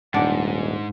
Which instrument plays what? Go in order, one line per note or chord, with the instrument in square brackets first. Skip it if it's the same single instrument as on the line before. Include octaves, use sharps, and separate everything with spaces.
[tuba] D#1 [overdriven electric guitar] G#2 [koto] D4 D5 [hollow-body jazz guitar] F#5